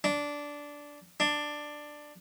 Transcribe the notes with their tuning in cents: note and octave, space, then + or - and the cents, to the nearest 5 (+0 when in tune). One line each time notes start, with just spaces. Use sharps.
D4 -10
D4 +10